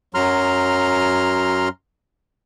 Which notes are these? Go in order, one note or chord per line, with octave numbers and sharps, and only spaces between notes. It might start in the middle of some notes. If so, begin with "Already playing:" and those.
F#2 F#3 A#5 C6 F6